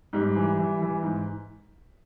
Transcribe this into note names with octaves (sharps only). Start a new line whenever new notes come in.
G#2 G3
E3
E3
E3
G#2